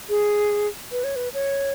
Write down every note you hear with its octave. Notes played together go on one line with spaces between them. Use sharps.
G#4
B4
C#5
B4
C#5